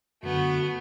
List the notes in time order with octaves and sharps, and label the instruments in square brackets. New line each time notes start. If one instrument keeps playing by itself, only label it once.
[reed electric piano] F#2 D3 [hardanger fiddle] A3 B3 [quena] F#4